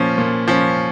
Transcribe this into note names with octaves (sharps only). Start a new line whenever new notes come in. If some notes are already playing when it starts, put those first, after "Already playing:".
Already playing: A#2 F3 C#4
A#2
F3 C#4